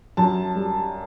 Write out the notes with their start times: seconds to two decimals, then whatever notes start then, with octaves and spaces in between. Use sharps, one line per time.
0.17 F#2 A5
0.55 G3